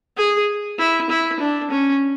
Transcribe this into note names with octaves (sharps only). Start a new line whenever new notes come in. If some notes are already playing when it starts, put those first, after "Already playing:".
G#4
E4
E4
D4
C#4